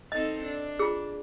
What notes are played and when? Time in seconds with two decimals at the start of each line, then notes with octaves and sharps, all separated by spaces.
0.12 C4 D#4 A4 D#5
0.43 D4
0.79 F4 G#4